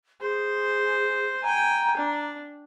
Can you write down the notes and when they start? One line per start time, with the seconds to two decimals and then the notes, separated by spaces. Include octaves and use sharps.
0.21 G#4 C5
1.43 G5 G#5 A#5
1.97 D4